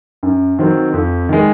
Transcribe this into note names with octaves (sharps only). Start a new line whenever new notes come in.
F#2
D#3 F#3 C4
F2
D#3 G#3